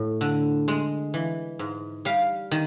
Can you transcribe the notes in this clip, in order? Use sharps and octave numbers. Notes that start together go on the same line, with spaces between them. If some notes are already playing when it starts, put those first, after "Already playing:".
Already playing: A2
D3
G#3
E3
G#2
G3 F5
D#3